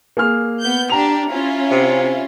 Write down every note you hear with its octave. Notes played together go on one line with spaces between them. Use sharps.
A#3 G#4 F6
B3 G6
D4 G4 A#5 F7
C#4 E4 F4
C3